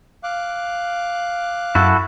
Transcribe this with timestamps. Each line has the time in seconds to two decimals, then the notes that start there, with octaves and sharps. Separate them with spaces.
0.24 F5 D6 F#6
1.75 F#2 E4 F#4 A4